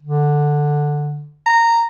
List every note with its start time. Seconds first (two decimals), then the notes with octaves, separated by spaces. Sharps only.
0.03 D3
1.46 A#5